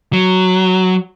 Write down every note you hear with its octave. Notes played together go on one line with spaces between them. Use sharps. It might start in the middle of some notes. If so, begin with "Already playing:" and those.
F#3